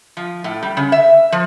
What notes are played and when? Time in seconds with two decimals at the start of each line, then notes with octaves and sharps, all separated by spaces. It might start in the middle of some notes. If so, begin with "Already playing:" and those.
0.17 F3
0.44 A2
0.63 G3
0.77 C#3
0.92 E5
1.32 F3